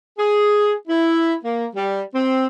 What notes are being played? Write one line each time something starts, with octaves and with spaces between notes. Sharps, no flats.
G#4
E4
A#3
G3
C4